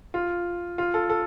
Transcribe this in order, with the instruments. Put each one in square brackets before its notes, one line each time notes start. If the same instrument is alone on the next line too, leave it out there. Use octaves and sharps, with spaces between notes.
[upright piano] F4
F4
A4
A4